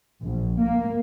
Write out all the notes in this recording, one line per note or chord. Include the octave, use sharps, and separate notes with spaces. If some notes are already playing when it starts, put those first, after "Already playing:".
A#1
A#3